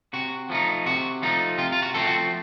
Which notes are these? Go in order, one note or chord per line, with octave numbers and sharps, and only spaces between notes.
C3 F#4
F3 A3 D#4
C3 F#4
F3 A3 D#4
C3 F4
F4
F#4
F3 A3 C4 A4
F#4